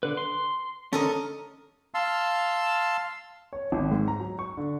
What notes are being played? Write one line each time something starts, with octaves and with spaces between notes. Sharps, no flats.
D3 B4
C6
D3 C#4 A4 A#4 D#5
F5 A5 C6 E6
C#5
G#1
G#2
A#5
F#3
C#6
D3